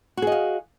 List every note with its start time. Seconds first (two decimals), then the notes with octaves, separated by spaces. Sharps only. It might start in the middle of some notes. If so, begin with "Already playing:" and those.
0.17 F#4
0.22 G#4
0.27 D#5
0.32 F5